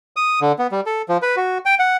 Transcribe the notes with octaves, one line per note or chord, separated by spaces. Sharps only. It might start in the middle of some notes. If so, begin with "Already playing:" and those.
D#6
D3
B3
G3
A4
F3
B4
F#4
G5
F#5